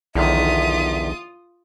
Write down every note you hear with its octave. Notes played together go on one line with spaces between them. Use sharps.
B1 E2 D3 D#3 F4 E5 D#6